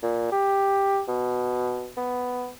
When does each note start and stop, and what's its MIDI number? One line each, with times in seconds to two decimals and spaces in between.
0.02 0.27 46
0.32 1.01 67
1.08 1.90 47
1.97 2.51 59